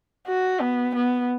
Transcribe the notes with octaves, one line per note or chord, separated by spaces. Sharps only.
F#4
B3
B3